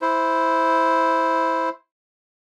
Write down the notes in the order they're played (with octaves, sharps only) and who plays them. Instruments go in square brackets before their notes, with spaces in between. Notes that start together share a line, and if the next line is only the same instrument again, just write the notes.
[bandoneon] E4 C5